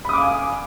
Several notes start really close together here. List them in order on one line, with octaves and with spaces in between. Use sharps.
B5 D#6 D6 F5 G#5